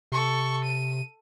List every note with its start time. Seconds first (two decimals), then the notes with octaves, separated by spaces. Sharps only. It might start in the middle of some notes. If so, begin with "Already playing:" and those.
0.12 C3 A4 C#6
0.64 D#7